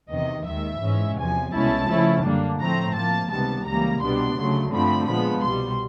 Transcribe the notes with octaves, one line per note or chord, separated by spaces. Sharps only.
E2 C3 D#3 D#5
D#2 D#3 G#3 E5
G#2 E3 G#3 C#4
E2 C3 F3 G#5
C2 B2 G#3 C#4 E4 A5
C#3 F3 A3 C#4 E4
F#2 D3 G3 A#3 D4
A2 F3 A3 C4 A#5
A2 F3 A#3 A5
C#2 C3 D#3 G3 B3 A5
C#2 C#3 E3 G3 A#3 A#5
C2 B2 G3 B3 D4 C6
D2 C#3 F#3 A3
G2 D3 F3 A3 C4 B5
A#2 F3 G#3 B3 B5
C2 B2 G3 C6